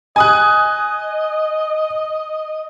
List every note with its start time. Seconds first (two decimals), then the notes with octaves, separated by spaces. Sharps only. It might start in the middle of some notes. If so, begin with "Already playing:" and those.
0.16 D#5 G#5 D#6 F#6